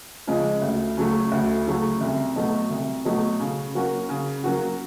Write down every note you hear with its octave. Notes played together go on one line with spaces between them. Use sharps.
C#3 F3 G#3
D2
C#3 F#3 A3
D2
C#3 F#3 A3
C2
B2 F#3 A3
C2
B2 F#3 A3
C#3
F#3 A#3 C#4 F#4
C#3
F#3 A#3 C#4 F#4